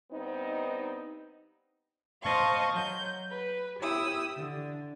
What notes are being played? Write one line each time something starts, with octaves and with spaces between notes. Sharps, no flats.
G2 B3 C4 D#4
C5 D#5 F5 A5 C#6
F#3 G6
B4
E4 G4 D#6 E6
D3